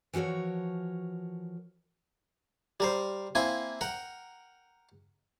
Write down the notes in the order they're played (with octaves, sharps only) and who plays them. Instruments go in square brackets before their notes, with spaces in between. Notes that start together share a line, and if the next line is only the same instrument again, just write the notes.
[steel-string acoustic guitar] E3 F3 F#4 A#4 C#5
[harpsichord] G3 A#4 C5
A#3 C4 E4 G#5
A#4 F#5 G5